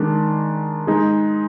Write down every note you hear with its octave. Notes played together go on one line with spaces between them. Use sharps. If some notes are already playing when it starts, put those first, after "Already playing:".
Already playing: D#3 G#3 D4
G#3 D#4 G#4